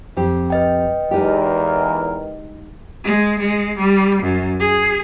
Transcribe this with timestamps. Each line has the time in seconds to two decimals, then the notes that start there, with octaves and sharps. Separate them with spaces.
0.17 F2 C4 G4
0.50 B4 D#5 G5
1.11 E2 G#3 D#4 G4 A#4
3.04 G#3
3.40 G#3
3.78 G3
4.23 F#2
4.60 G#4